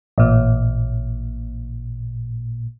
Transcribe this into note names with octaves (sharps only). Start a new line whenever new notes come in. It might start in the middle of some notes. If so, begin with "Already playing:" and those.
A1 A#2